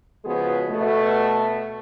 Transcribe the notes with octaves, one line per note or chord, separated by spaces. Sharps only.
C#3 F3 G#3 B3 F#4 G#4
B2 A3